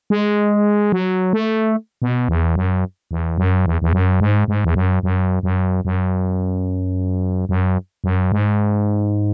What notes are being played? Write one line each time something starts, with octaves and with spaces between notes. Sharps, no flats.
G#3
F#3
A3
B2
E2
F#2
E2
F#2
E2
E2
F#2
G#2
G#2
E2
F#2
F#2
F#2
F#2
F#2
F#2
G#2